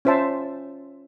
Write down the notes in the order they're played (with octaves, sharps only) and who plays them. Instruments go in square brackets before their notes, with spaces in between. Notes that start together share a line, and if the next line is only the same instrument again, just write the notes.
[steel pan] C#4 F4 C5 E5 A5